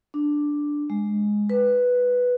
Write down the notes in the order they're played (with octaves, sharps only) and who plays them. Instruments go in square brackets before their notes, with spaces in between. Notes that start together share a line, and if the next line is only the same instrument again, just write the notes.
[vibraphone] D4
G#3
B4